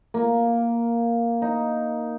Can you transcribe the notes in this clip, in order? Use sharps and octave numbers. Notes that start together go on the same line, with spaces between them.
A#3
D#4